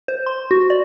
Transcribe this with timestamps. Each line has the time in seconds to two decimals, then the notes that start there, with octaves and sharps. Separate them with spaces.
0.08 C5
0.26 C6
0.51 F#4
0.70 D5